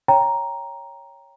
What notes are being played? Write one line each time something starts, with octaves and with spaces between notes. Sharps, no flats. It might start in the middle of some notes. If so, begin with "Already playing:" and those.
C#5 G5 A#5